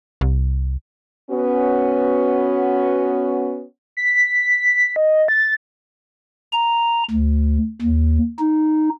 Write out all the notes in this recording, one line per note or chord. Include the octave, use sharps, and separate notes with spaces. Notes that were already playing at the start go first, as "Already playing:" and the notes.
C2
B3 C#4 F#4
B6
D#5
A6
A#5
D2
D#2
D#4